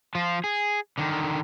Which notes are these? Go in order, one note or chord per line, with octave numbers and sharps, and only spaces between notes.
F3 F4
G#4
D3 D#3